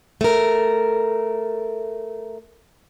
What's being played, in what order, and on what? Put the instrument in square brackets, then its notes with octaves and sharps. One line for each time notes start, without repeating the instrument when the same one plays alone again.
[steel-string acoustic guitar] A3 A#4